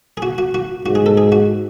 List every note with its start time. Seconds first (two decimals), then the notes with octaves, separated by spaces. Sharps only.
0.17 G#4
0.22 F#4
0.38 F#4
0.54 F#4
0.85 G#2 F#4
0.95 G#4
1.06 A4
1.17 G#4
1.32 F#4